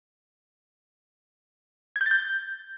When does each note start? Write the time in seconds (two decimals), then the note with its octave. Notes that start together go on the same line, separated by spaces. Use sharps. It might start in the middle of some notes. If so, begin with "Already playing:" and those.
1.96 G#6
2.01 G6
2.06 A6
2.11 G6